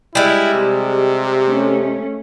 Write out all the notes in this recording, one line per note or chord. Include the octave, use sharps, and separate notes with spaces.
G3 G#3 E4
C3
A3 C#4